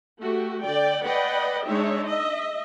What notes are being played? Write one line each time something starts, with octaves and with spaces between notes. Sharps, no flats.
A3 F#4 G4
D3 D5 G5
B4 D5 D#5 F#5 G5
G#3 D4 D#4 C#5 E5
D#5 E5